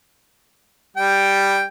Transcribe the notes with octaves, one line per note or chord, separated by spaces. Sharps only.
G3 G5